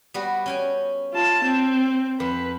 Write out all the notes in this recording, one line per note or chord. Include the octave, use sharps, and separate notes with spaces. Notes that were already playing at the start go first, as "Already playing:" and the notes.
G3 B3 F#4
C#4 G5 G#5
F4 A5
C4
F2 B4